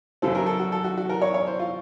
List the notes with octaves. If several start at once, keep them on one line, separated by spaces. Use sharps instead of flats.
F#2 C#3 F#3 C4 A4
A#4
A4
F#4
A4
F#4
F#4
A#4
C#5
C#5
C5
F4